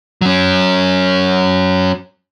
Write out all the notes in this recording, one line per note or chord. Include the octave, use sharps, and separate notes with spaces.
F#3 C#4